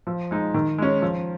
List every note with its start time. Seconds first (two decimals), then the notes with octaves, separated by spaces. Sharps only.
0.07 F3
0.31 G#3 D#4
0.54 D#3
0.78 G#3 C#4
1.02 F3